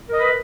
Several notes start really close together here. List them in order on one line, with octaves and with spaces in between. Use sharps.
A#4 D#5 B4